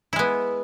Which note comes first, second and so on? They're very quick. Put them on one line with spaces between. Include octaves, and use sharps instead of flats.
E4 G#3 B3